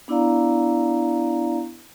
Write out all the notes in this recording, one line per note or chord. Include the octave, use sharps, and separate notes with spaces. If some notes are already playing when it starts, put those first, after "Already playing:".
B3 D4 E4 D5 F5 A#5